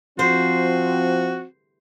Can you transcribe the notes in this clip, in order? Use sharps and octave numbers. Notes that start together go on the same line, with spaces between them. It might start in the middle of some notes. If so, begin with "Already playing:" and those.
F3 C4 F#4 C5